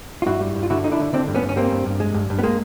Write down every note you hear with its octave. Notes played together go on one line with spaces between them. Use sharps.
F4
G2 E4 F#4
G3
G2
F4
D3 E4 F#4
D3 D#4
D4 E4
D3
D3 C4 D4
G2
B3 C#4
G2
C#4
G3 A#3 C4
G2
G2
G#3
G2
G2
B3
G#3 A#3